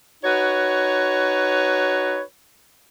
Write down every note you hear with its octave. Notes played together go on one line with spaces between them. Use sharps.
D#4 F#4 B4 C#5